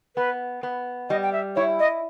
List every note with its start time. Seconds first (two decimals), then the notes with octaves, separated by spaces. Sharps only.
0.16 B3 B4
0.63 B3
1.10 G3 D#5
1.22 G5
1.33 E5
1.56 E4 C#5
1.79 D#5